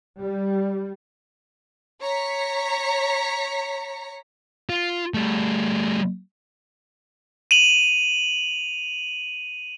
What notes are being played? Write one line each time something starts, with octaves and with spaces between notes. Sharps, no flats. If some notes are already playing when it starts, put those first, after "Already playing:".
G3
C#5 A#5 B6 C#7
F4
G3 A3
D#7 F7 F#7